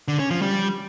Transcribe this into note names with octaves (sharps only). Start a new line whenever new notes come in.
D3
C#4
F3
G3